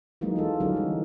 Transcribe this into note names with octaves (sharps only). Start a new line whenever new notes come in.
E3 F#3 G#3 A#3 D#4
A#3 F4 A4
D3 F#3 G3 C#4 D#4 A#4
E3 G#3